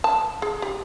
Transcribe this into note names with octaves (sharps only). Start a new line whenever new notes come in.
A5
G#4
G4